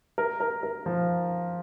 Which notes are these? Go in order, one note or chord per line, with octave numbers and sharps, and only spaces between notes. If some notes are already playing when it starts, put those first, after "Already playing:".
A#4
A#4
A#4
F3